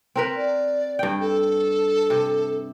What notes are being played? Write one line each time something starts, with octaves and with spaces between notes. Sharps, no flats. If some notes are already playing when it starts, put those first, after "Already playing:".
C4 A#4 B4
D5
G2 G5
A4
C3